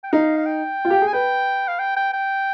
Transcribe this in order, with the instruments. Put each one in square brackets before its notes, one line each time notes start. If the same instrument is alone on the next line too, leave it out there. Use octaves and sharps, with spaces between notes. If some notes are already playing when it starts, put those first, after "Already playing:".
[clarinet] G5
[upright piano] D#4 [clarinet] F5
[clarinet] F5
G5
[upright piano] F4
G4
G#4
[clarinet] G#5
[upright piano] B4 [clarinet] G5
[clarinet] F5
G5
G5
G5